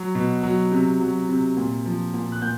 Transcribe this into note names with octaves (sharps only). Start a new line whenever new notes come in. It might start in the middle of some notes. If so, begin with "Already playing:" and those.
Already playing: F#3
B2
F#3
C3
F#3
C3
A#2
F3
A#2
F#6
A#2 G6